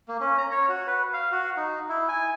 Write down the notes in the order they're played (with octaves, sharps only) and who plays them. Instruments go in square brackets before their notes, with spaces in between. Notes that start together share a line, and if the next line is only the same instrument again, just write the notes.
[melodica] A#3
C#4
A#5
C#5
F#4
B4
F5
F#4
D#4
E4
G#5